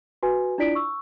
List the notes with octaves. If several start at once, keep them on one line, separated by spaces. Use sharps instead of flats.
F#4 B4 G#5
D4 E4 F4 D5 B6 D7
C#6 E6